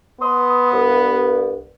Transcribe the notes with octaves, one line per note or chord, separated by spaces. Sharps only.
B3 B5 C6 D#6
C2 G2